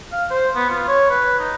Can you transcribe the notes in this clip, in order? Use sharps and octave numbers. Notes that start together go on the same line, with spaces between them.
F5
C5
B3
F4
C#5
B4
D#4